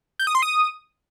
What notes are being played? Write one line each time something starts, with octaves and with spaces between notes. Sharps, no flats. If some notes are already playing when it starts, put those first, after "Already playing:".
G6
D#6
C6
D#6